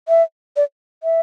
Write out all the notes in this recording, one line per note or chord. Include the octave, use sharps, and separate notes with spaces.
E5
D5
E5